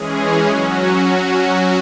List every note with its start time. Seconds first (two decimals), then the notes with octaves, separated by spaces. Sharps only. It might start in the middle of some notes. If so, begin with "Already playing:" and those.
Already playing: E3 G#3 C#4 G#4
0.47 F#3 C#4 F#4
1.03 F#3 C#4 F#4